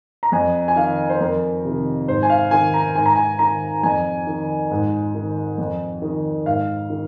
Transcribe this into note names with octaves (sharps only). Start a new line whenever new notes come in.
A#5
F2 G#5
G#5
D#3 F5
C5
F2 A#4
C3 D#3
G#2 C5
G#5
F5
D#3 G#5
A#5
G#2 G#5
A#5
G#5
D#3 A#5
F2 G#5
D#3
G#2
D#3
F2
D#3
G#2 F5
D#3